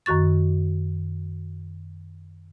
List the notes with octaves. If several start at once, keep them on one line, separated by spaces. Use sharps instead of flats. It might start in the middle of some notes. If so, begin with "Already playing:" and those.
F#2 D#3 F#4 C#6 A6